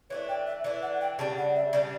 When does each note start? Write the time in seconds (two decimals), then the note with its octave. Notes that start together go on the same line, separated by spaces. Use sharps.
0.10 E3 A3 D4 C#5
0.29 G5
0.47 E5
0.64 E3 A3 D4 D5
0.82 F#5
1.01 G5
1.19 C#3 G3 D4 A5
1.37 F#5
1.56 E5
1.73 C#3 G3 D4 D5